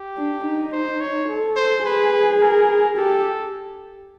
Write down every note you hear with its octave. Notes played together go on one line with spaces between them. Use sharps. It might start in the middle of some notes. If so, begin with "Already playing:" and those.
Already playing: G4
D4
D#4
C5
C#5
A4
C5
G#4 B4
A#4
G4 A4